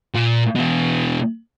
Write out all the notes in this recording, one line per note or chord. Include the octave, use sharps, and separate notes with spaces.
A#2
B2 E3